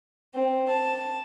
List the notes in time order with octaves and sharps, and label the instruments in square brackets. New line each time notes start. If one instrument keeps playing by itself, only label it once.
[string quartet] C4
A5